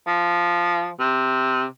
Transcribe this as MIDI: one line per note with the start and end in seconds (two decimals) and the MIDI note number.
0.07 0.90 53
1.00 1.65 48